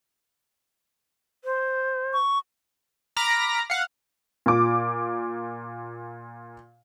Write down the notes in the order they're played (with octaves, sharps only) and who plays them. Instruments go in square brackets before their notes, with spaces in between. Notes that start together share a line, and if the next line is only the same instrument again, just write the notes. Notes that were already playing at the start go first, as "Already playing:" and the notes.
[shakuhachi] C5
[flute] C#6
[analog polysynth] A#5 B5 D6 F6 A#6
F5 F#5
[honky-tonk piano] A#2 D6